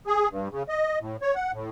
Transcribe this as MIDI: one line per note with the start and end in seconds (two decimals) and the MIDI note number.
0.07 0.29 68
0.31 0.48 43
0.51 0.63 49
0.69 0.99 75
1.00 1.17 45
1.22 1.35 73
1.35 1.52 78
1.53 1.70 45